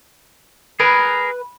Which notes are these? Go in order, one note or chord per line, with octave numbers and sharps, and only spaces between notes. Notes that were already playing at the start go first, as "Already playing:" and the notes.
G#4 A#4 B4